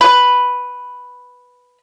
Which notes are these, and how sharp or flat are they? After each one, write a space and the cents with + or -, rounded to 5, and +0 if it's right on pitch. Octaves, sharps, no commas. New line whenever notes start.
B4 +0